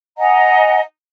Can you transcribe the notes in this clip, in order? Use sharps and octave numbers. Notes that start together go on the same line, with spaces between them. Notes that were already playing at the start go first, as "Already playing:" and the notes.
D#5 F#5 G#5 A#5